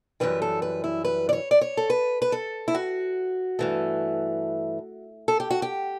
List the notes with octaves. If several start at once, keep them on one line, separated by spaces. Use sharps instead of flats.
F#2 E3 G3 B4
A4
B4
E4
B4
D5
C#5
D5
C#5
A4
B4
B4
A4
E4
F#4
G2 E3 A3
A4
G4
F#4
G4